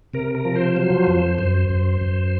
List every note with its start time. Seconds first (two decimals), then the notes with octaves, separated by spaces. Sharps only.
0.14 C3 A#4
0.35 A#4
0.45 F3
0.55 C5
0.77 F#3
1.07 F2
1.38 F#2 C5
1.69 F#2
2.01 F#2